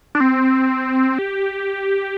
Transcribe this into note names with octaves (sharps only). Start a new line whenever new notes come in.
D4
C4
G4